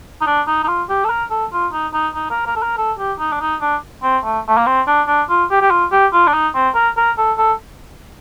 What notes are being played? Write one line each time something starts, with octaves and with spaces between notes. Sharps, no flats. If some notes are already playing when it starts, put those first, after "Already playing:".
D#4
D4
D#4
D#4
F4
G4
A4
A#4
A4
F4
D#4
D#4
D#4
A#4
A#4
A4
A#4
A4
G4
D#4
D4
D#4
D4
C4
A3
A3
A#3
C4
D4
D4
F4
G4
G4
F4
G4
F4
D4
D#4
C4
A#4
A#4
A4
A4